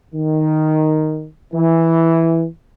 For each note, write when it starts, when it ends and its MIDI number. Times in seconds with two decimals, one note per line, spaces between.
0.14 1.27 51
1.53 2.45 52